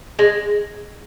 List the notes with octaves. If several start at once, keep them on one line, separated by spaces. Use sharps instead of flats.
G#3